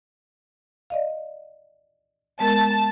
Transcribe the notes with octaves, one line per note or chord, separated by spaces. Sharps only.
D5 D#5 F5
G#3 B3 A#4 A5